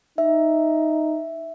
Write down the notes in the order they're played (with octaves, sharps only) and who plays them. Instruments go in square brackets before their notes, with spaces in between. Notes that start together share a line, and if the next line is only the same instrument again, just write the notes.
[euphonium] D#4 [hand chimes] E5